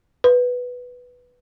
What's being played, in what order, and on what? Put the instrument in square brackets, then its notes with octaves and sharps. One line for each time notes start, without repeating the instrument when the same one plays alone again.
[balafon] B4